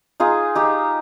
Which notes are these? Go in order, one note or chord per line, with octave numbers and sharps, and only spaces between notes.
D#4 F4 G#4
D#4 G4